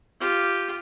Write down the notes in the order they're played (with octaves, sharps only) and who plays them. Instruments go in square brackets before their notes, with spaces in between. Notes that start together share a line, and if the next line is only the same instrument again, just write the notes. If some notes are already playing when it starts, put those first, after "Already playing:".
[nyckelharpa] F4 G4